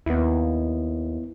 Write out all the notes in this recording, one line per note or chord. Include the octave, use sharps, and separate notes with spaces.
D#2 B3 E4